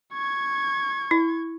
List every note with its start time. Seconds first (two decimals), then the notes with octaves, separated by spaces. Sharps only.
0.13 C#6 G#6
1.11 E4